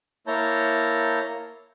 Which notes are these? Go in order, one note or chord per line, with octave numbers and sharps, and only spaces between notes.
A#3 E4 C#5 A5 A#5 G6